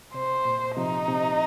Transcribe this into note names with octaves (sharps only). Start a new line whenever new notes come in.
C3 C5
A#2
C3 F3 D#4
C3